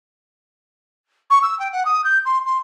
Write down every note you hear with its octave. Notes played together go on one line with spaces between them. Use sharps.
C#6
E6
G5
F#5
D#6
G6
C6
C6